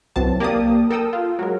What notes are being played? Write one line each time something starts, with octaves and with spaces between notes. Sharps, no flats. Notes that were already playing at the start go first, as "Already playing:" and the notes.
C2 E3 F#3 C4 A5
A#3 G4 D5 A5 D#6
A4 A#4 G5 D#6 E6
F4
F#3 G#3 A#4